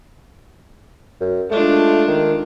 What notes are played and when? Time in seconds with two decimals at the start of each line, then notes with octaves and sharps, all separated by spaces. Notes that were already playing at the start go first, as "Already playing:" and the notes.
1.21 F#2
1.50 G#3 A3 D4 F4
2.08 D#3